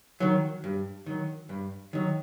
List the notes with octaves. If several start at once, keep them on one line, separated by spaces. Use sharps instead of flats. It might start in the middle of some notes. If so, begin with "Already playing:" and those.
D#3 F#3
G2
D#3 F#3
G2
D#3 F#3